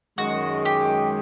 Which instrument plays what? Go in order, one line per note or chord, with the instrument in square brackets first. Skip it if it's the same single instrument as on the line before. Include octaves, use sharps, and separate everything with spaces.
[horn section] F#2 D#3 G#3 [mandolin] F#4
[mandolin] G4